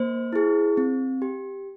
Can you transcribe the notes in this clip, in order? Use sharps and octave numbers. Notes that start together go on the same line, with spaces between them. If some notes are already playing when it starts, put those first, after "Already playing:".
Already playing: A#3 C5
E4 G#4
C4
G4